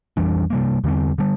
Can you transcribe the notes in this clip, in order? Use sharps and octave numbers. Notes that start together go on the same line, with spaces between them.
F2 E3 G3 D4
C3 G3 A#3
E2 D3 G3 C4
D3 G3